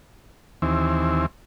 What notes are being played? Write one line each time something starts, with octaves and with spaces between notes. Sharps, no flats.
D#2 E3 C4